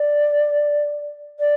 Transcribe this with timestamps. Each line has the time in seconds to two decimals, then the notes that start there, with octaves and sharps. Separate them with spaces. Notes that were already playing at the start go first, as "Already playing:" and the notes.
Already playing: D5
1.39 D5